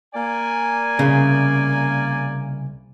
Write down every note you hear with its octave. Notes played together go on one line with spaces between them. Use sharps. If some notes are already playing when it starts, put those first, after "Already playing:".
A#3 D5 G#5
C2 C#3